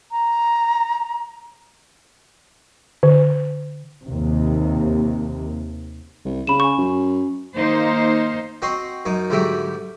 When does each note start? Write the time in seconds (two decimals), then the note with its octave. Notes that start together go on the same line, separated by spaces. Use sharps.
0.12 A#5
3.03 D3
4.07 D#2 C3
6.25 C2
6.47 C#3 B5 E7
6.60 G#5 C#6
6.78 F#2
7.57 D#3 A#3 D#4 C5
8.62 C4 F#4 D#5 C6
9.05 F#2 D#4
9.30 D2 G#2 F#3 G3 E5 D6